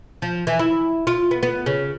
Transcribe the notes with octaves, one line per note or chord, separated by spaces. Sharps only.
F3
E3
E4
F4
B3
B3
C#3